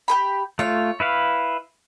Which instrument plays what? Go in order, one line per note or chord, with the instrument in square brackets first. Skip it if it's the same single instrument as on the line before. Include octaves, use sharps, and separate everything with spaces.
[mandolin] G4 G#4 B5
[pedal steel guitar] A3 F4 [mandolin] C#5
[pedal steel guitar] E4 B4 F5